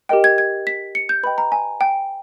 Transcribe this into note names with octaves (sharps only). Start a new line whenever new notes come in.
G4 A#4 D#5 G5
G#6
G#6
B6
C#7
G6
B4 D#5 G5 B5
A#5
G#5
G5